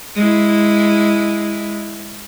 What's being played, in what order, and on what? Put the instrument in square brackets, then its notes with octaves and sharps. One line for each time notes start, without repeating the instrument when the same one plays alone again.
[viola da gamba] G#3 E4